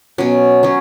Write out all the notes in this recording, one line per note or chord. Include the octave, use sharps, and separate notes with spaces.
B2 F#3 C#4
F#3 C#4